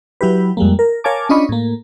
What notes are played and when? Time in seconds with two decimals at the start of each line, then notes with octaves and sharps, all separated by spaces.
0.21 F#3 E4 G4 B4
0.57 F2 G3 G#3 A#3
0.79 A#4
1.04 A#4 C#5 F5 G#5 A5 D6
1.29 C#4 D4 F4 D#5 B5 C#6
1.49 A2 A#3